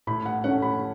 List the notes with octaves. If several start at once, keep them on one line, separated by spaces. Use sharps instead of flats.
A2 B5
F#5
A3 C#4 F#5
B5